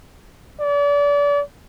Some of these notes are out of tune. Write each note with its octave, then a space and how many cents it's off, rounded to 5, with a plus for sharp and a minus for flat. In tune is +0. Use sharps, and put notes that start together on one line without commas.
D5 -35